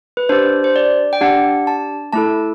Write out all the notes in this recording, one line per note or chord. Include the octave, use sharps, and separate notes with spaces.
B4
D4 G4 C5
C5
D5
G5
D4 G4 F#5
A5
A3 E4 A4 A5